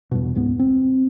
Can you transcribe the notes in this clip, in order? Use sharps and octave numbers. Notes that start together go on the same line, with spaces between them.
E2 G2 B2
C#2 G#2 B3
C4